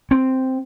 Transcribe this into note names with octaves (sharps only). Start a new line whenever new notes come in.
C4